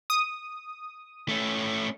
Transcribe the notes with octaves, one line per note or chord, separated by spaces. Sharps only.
D#6
A3 C#4